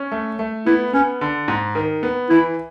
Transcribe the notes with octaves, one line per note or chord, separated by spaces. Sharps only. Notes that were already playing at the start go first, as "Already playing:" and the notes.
Already playing: C#4
A3
A3
B3 E4
B3 C#4
D3
G#2
D#3
B3
E3 E4